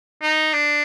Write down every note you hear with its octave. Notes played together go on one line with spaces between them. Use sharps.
D#4
D4